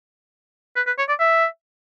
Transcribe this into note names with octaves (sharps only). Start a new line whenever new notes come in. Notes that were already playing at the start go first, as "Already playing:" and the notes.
B4
B4
C#5
D5
E5